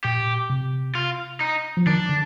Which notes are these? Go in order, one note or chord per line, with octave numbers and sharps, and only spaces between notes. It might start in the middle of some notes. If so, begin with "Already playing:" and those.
A#2 G4
C3
F4
D#4
F3
D#3 D4
D3